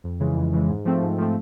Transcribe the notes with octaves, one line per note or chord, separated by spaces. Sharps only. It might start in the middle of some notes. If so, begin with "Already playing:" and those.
F2
C#3 E3 G#3
F2
C#3 E3 G#3
G#2
F3 A3 C4
G#2
F3 A3 C4